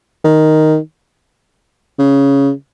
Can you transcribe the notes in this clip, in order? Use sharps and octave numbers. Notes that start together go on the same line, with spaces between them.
D#3
C#3